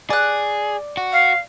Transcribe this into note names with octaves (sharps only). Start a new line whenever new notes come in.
G#4 D5 F#6
F#4
F5